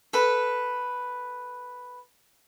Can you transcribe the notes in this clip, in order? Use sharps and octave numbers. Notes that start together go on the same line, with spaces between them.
A4 B4